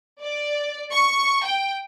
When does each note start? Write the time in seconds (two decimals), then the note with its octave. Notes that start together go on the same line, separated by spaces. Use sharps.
0.22 D5
0.93 C#6
1.45 G5